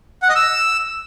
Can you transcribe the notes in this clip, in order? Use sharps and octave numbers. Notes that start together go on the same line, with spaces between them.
F#5
D#5
E6